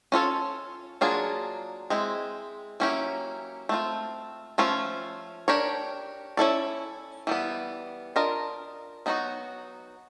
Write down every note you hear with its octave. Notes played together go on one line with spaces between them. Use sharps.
C#4 F4 A4 C#5
F#3 A#3 D4 F4 G#4
G#3 C4 E4
F#3 A#3 C#4 E4 G4
A3 C4 F4
F3 A3 C#4 F4
D4 G4 A#4 C#5
C#4 E4 A4 D5
E3 G3 B3
D4 F4 A#4 D#5
F#3 B3 D#4 F#4